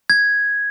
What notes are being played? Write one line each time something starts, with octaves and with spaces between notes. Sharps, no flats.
G#6